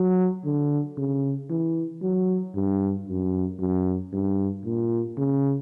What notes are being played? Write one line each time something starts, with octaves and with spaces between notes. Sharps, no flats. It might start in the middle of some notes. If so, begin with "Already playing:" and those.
Already playing: F#3
D3
C#3
E3
F#3
G2
F#2
F#2
G2
A#2
C#3